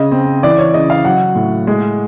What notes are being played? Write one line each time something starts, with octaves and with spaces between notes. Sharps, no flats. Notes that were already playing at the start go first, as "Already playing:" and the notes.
Already playing: C#3 D#5
C4
E3 D5
C#5
C#3 D#5
F5
F#3 F#5
A2
G#3